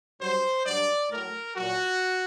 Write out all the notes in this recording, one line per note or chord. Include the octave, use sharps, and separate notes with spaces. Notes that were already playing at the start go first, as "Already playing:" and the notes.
G2 F#3 C5
G2 F#3 D5
A2 F#3 A#4
A#2 F#3 F#4